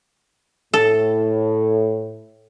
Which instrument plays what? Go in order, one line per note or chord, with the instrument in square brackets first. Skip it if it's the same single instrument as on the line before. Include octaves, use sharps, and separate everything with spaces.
[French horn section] A2 [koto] A4